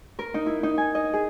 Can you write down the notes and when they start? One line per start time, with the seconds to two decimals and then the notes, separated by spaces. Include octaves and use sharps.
0.19 A#4
0.34 D#4
0.46 E4
0.63 D#4
0.78 G#5
0.95 D#5
1.13 G#4